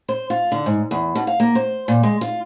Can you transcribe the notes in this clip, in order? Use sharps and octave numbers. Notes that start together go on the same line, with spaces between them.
C5
F4
D3
G#2
E2
B2
F5
A#3
C5
A#2
G#3
F4